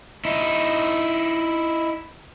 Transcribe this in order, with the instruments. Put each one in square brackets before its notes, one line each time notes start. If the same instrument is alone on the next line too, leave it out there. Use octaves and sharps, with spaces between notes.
[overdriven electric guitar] D#4 E4